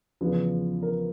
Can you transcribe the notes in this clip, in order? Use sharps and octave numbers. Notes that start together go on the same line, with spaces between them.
E2 C#3 F3 B4
A#4